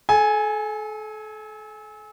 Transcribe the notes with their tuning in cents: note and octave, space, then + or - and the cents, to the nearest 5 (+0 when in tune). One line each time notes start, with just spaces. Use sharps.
A4 -35 G#5 +0